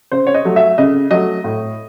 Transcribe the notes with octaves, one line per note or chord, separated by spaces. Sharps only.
C#3 C5
C#5
D#5
F#3 A3
E5
C#3 D#5
F#3 A3 D#5
A2